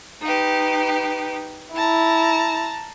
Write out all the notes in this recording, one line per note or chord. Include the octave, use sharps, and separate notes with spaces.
D#4 G4 B4
E4 A5 A#5